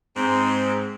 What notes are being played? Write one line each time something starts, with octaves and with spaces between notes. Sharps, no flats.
G#2 C4